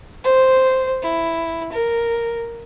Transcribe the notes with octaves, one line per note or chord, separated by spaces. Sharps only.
C5
E4
A#4